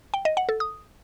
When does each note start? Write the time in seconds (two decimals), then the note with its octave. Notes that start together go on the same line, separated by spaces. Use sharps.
0.14 G5
0.25 D#5
0.37 F#5
0.49 A4
0.60 D#6